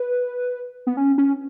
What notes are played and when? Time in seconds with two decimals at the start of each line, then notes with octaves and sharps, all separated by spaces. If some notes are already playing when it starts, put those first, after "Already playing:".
Already playing: B4
0.87 B3
0.97 C#4
1.18 C#4